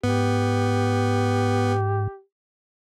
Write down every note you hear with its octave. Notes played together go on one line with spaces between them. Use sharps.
G#2 B3 G4